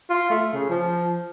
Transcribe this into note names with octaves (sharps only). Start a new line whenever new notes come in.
F4
A3
C#3
F3